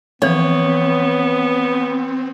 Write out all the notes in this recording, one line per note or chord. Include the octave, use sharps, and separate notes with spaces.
E3 F3 B3 C4 C#5